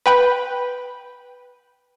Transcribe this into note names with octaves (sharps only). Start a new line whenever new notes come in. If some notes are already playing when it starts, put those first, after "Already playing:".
B4 G5 B5